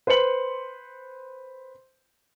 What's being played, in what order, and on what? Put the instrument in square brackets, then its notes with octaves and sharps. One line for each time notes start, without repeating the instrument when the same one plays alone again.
[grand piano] B4 C5 C6 C#7 F#7